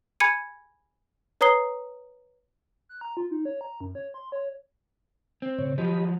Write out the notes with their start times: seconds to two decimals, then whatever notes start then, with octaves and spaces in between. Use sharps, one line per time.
0.20 G#5 B5 G#6 C#7 D#7
1.41 B4 C#5 A#5 D#6 C7 G7
2.89 F#6
3.01 A#5
3.17 F4
3.31 D#4
3.45 C#5
3.61 A#5
3.80 F#2
3.95 C#5
4.14 C6
4.32 C#5
5.42 C4
5.58 A2 C#3 C#5
5.78 F3 F#3 G4 D#5 B5